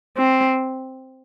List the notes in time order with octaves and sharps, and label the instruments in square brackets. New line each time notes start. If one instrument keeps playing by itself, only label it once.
[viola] C4